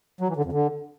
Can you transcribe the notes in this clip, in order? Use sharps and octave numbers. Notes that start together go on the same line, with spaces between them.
F#3
E3
D3
F2
D3